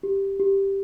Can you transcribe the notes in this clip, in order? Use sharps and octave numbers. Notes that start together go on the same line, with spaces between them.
G4
G4